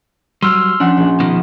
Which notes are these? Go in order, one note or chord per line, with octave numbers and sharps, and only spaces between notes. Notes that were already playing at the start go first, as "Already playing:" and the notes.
F#3 G3 C6 E6 F6
F3 C#4 D4 F#5 C6
A#1
B2 D#3 F3